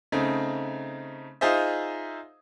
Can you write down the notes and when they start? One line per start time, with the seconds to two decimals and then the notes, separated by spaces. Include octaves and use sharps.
0.12 C#3 A3 C4 D#4
1.41 D#4 F4 G#4 C5 D#5 E5